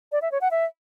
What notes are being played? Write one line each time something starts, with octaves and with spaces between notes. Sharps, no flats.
D5
E5
C#5
F#5
E5